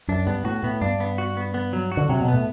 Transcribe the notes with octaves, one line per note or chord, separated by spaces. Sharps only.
F#2 D4
G2 B3
A2 F#4
A2 B3
G2 D4
B3
F#4
B3
B3
F#3
F#4
D3
C3 F#3
B2
B3
A2